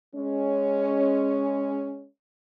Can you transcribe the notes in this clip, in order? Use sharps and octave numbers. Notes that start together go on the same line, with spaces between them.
G#3 C#4